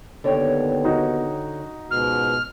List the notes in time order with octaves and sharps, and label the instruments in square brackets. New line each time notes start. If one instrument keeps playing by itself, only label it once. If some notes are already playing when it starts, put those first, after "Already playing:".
[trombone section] D#2 B3 [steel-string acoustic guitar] D3 C#5 G5
[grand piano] D#4 F#4
[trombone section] C#2 G#2 B2 [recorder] F6